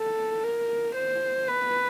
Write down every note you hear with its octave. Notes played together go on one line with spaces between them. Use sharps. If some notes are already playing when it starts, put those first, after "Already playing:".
Already playing: A4
A#4
C5
B4